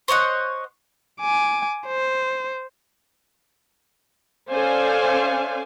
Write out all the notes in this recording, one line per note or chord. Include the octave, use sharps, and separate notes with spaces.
C5 C#5 D#5 F#5
G#5 D6
C5
C#4 A4 C5 D5 F5 G#5